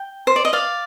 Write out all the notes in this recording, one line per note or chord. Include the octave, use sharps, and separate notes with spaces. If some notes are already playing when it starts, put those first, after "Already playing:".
Already playing: G5
C5
D5
D#5
D5 F5